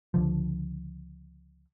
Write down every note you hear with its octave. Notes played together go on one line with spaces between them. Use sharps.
C#2 D3 F3